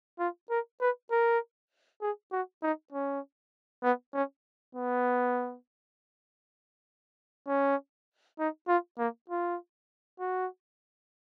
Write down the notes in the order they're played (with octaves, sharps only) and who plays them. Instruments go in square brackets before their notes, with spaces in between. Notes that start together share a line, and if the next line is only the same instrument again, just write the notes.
[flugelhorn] F4
A#4
B4
A#4
G#4
F#4
D#4
C#4
B3
C#4
B3
C#4
D#4
F4
A#3
F4
F#4